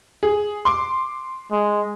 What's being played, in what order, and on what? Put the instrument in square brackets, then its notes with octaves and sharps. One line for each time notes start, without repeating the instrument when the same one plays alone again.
[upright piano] G#4
C6 D6
[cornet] G#3